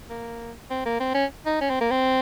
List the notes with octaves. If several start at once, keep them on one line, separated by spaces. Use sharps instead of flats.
A#3
C4
A#3
C4
C#4
D#4
C#4
C4
A#3
C4